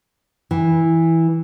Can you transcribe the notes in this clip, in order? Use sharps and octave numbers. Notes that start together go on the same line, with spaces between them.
E3